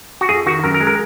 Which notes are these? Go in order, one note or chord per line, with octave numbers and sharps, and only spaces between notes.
F#4
F2 G#4
D#3 F#4
F#2 A#4
A#4
G#3
A#4